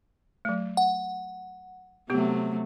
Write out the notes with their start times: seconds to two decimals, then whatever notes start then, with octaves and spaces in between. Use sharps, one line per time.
0.45 F#3 A3
0.77 F#5
2.10 C3 F#3 A3 B3 G4